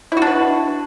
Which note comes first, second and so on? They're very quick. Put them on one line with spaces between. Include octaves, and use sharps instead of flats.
E4 F#4 D4 B4